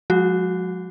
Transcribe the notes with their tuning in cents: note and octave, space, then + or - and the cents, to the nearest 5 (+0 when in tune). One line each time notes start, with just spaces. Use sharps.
F3 +45 G#3 +0 F#4 +0